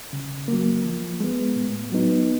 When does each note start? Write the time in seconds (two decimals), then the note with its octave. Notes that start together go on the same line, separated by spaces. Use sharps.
0.13 C#3
0.48 F#3 A#3
0.85 F3
1.20 G#3 B3
1.56 A2
1.92 F#3 B3 D#4